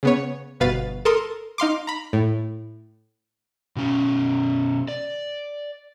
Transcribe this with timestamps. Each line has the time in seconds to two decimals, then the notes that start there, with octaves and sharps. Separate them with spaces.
0.03 C#3 B3 C#5
0.60 G1 B2 B4 F5 A6
1.05 A4 A#4 C6 D#6
1.58 D#4 F5 C6 D6
1.87 A#5 B5
2.13 A2
3.76 B2 C#4
4.88 D5